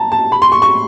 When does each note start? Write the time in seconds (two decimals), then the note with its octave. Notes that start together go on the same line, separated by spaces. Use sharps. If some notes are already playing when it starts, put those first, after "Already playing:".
Already playing: A5 A#5
0.12 A5
0.32 B5
0.42 C6
0.52 C#6
0.62 C#6